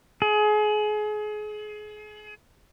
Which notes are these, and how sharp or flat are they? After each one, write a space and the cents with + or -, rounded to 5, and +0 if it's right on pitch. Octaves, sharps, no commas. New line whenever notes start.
G#4 +30